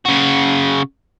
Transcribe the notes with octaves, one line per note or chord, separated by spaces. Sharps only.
C#3 F#4